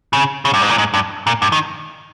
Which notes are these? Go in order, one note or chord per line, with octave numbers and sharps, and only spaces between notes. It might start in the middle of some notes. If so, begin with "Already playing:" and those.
C#3
C#3
G2
G#2
A#2
G#2
G2
A#2
G2
D#3